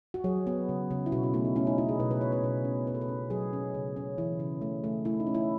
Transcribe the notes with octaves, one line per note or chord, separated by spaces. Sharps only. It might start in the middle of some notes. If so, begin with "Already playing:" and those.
F#4
F#3 G#4
B3
C#3
C#3
E4
B2 F#4
F#4
A3 E4
D#4
C#4 E4
D#4
C#4 E4
G#4
B2 B4
B4
C#4 C#5
B4
B2
C#4
C#4 B4
A4
B4
C#4
F#3 G#4
C#4
C#3
C#4
E3 E4
C#3
A3
A3
A3 E4
D#4
C#4
E4